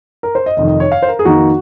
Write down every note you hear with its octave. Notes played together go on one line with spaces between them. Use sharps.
A#4
C5
D#5
F1 F2 D#3 D#5
D#5
C#5
F5
C5
A#4
G#4
F2 D#3 A#3 D#4 F#4